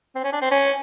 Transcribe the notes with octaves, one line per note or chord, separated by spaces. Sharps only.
C4
C#4
D4
C4
C#4